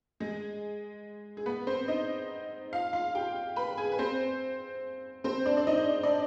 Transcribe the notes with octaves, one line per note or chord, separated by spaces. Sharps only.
G#3 G#4
G#4
B3 B4
C4 C5
D#4 D#5
F4 F5
F4 F5
G4 G5
B4 B5
G#4 G#5
B4
C4 C5
C4 C5
D4 D5
D5
D#4 D#5
D4 D5